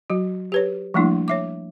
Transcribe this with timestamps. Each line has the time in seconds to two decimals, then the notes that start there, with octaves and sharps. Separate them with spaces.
0.10 F#3 F#4
0.52 G4 B4 C#5
0.94 F3 G3 A3 A#3 D4 E4
1.28 C#5 E5 D6